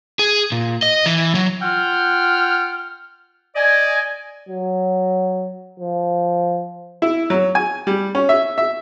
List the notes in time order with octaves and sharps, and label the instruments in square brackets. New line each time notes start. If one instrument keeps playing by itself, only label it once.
[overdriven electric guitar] G#4
A#2
D#5
E3
F#3
[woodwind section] F4 F#5 G5 F6
D5 D#5 G#5
[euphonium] F#3
F3
[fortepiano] E4
F#3
G#5
G3
C#4
E5
E5